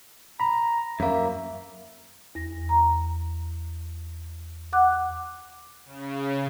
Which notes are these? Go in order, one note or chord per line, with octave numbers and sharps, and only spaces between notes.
A#5 B5
F#2 A#3 E5
E2 A#6
A#5
F#5 D6 F#6
C#3